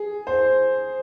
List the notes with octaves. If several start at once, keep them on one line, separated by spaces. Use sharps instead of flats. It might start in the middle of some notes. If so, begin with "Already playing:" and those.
Already playing: G#4
C5